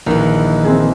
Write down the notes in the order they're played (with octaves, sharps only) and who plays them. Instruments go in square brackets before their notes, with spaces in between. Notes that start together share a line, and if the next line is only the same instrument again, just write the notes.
[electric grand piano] A#1 [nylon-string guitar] D#3 E3
[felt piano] C4 G#4